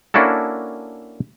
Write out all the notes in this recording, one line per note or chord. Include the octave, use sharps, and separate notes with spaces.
A#3 C#4 D4 E4 F#4 A4